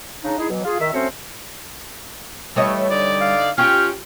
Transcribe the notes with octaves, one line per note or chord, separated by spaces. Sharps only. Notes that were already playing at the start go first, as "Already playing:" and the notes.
C#3 D4 D#4
D#4 E4 G#4
B2 E3 F#3
F4 G#4
D#3 E5
F#3 A3 C4 C#4 C5 C#5
A2 E3 G3 A3 C#5 D#5
D3 D#4 D5
F5
C#4 F4 G4 C#5 G5 F6